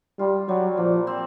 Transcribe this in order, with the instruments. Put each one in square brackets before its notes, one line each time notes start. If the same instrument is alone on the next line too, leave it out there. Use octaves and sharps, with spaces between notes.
[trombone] G3 [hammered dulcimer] F4
[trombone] F#3 [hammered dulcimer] G3
[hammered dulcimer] A#2 [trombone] F3
[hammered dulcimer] C4